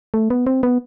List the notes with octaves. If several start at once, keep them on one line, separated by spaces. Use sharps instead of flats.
A3
B3
C4
B3